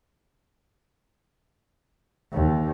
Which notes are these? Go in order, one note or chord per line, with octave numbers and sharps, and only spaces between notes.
D#2